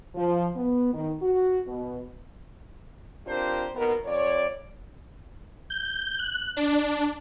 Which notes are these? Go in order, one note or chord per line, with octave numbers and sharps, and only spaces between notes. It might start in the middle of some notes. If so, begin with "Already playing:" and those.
F3
B3
D#3
F#4
B2
C4 D4 F4 G4 A#4 C5
D#2 B2 B3 A#4
F2 C#5 D5
G6
F#6
D4